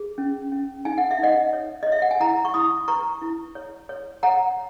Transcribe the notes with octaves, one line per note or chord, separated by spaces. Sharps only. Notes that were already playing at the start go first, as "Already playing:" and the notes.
Already playing: G#4
C#4
C#4
D#4 G#5
F#5
E5
D#4 D#5 F#5
C#5
C#5 D#5
E5
F#5
G#5
E4 F#5 A#5
C#6
E4 B5 D#6
B4 A#5 C#6
E4
C#5
C#5
C#5 F#5 A#5